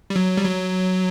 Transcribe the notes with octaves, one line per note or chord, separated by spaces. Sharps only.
G3
F#3
G3
F#3